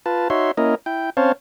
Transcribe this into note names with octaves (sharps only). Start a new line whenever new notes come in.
F4 B4 A5
D#4 F#4 C#5 E5 C6
A#3 C#4 E4 A#4 D#5
E4 G5
C4 C#4 C5 C#5 F5 A5